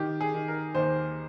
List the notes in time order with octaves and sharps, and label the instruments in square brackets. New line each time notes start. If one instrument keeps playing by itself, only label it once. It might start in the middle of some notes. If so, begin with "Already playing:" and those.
Already playing: [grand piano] D#3 G4
G#4
D#3
A#4
D#2 C5